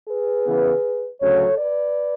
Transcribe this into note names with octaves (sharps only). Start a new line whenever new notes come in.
G#4 B4
C#3 E3 B3
D2 C#3 F#3 C#4 A4 C#5
B4 D5